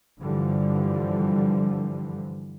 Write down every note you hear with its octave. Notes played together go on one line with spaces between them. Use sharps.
G2 D3 E3 F3 G3